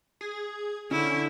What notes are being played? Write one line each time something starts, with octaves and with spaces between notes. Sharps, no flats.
G#4
D3 C#4 E4